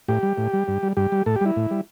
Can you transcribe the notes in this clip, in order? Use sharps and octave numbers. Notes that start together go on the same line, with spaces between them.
A2 G4
G3
A2
G3
G2
G3
G2 G4
G3
A2 A4
G4
G3 E4
A2
G3